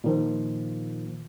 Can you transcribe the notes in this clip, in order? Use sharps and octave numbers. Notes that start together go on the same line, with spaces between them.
A#2 D#3 F3